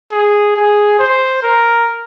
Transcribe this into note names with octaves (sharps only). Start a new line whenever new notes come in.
G#4
G#4
C5
A#4